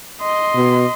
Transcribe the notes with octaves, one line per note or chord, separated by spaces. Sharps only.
D#5 C6
B2